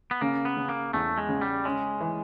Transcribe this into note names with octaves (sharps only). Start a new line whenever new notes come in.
B3
C#3 A#3
B3
C#3
A#3
E2 A3
G#3
C#3
G3
G#3 C#4
E3